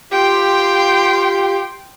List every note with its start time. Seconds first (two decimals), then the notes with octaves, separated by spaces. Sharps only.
0.13 F4 G4 G5 C6